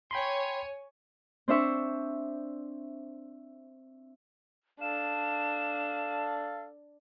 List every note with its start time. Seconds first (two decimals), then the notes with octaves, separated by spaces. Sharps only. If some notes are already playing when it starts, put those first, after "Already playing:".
0.11 C#5 G5 G#5 B5 C6
1.48 C4 D4 C5 E5 C#6
4.81 D4 A4 F5 E7